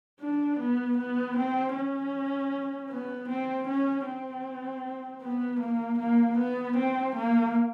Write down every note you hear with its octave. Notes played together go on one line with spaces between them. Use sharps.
D4
B3
B3
C4
C#4
B3
C4
C#4
C4
B3
A#3
A#3
B3
C4
A#3